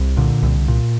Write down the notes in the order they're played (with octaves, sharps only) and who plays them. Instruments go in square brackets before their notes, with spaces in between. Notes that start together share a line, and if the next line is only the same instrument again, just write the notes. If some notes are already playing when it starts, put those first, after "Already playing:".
Already playing: [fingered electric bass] C2
A#2 D3
C2
A#2